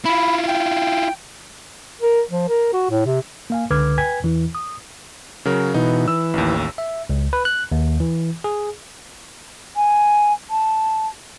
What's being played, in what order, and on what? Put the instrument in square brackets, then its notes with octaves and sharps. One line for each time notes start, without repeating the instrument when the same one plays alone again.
[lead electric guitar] E4 F4 [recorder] B5
[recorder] G5
[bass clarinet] A#4
F3
A#4
F#4
A2
C3
[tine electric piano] A#3 F5 G#5
C#2 D3 B4 D6 F6 G#6
B4 G5 G#5 G#6 B6
E2 E3 E4
D#6
[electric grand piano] C#3 F#3 A#4
[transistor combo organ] B2 E3 [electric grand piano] D#4
[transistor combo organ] E3 [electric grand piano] E6
[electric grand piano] A1 D#2
[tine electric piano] E5
C#2
B4
F#6
D#2
E3
G#4
[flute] G#5
A5